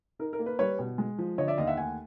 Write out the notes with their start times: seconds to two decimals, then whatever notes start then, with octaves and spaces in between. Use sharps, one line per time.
0.19 D#4 A#4
0.33 A#4
0.39 A#3
0.46 B4
0.59 G3 B4 C#5
0.79 B2
0.98 G#3
1.18 F3
1.38 D3 C#5 D#5
1.48 D5 E5
1.58 D#2 D#5 F5
1.67 E5 F#5
1.77 A3 F#5 G#5